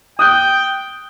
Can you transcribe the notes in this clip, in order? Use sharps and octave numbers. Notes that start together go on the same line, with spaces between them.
G5 D#6 F#6 G6